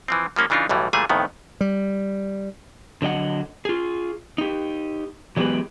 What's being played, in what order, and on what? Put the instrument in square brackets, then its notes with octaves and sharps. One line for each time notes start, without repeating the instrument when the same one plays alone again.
[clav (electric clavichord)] E3 F3 C4
F3 G3 A#3 C#4
C#3 E3 D4 D#4 F4
B1 A2 E3 G3
A#2 E3 G3 A3 G#4 G#5
F2 A2 D#3 B3
[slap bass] G3
[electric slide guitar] D3 F#3 D#5 F#5
F4 G#4
D#4 G4
E3 F#3 G#3 B3 G4 B4